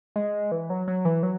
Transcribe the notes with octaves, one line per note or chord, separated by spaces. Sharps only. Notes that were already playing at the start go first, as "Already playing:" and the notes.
G#3
E3
F#3
F#3
E3
F#3